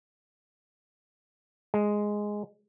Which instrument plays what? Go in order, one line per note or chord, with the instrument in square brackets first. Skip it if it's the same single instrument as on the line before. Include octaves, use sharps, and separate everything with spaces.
[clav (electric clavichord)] G#3